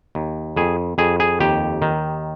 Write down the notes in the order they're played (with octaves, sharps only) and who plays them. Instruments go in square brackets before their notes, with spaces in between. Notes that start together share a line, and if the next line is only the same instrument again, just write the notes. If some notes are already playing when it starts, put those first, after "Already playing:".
[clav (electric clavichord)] D#2
F2 G#4
F2 G#4
G#4
D#2 G4
D#3